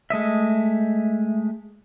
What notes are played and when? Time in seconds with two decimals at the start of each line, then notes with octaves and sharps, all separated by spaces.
0.10 G#3 A3 D#5 E5